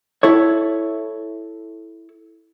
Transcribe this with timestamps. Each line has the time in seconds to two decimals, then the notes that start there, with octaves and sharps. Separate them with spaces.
0.23 E4 A4 C#5